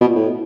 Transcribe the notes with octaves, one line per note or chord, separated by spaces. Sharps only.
B2
A#2
A2